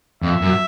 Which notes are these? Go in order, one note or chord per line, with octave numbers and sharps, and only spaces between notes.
F2 E5
F#2